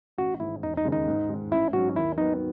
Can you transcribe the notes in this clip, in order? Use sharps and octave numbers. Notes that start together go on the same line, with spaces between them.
A1 F#4
G#2 D#3 E4
E1 D#4
D#4
D#2 C#3 G#3
D#4
G#2
D#3 G#3
A1 E4
G#2 F#3 C#4 F#4
D#2 E4
D#3 F#3 B3 D#4 F#4